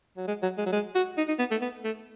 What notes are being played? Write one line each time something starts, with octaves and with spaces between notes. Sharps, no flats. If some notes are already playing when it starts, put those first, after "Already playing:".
F#3
G#3
F#3
G#3
F#3
G#3
F#4
D#4
D#4
B3
A3
B3
A3